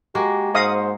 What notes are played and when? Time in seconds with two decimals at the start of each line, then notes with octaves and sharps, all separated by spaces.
0.15 G#3 A#3 F#4 G4
0.55 G#2 C5 D#5 F5 F#5 D#6